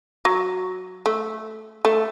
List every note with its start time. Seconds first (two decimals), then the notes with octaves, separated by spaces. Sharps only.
0.25 F#3
1.06 A3
1.85 A3